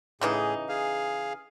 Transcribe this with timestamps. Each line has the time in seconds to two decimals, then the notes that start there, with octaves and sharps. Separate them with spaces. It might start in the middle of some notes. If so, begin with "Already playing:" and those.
0.21 A2 C#3 E3 D#4 G#4
0.69 G#4 F5